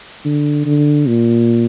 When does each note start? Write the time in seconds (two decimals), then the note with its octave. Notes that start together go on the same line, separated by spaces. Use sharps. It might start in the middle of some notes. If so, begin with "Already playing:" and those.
0.25 D3
0.66 D3
1.08 A#2